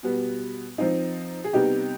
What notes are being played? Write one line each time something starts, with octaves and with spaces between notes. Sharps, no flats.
B2 G3 B3
F3 C4 D#4
G#4
C3 G3 B3 D#4 G4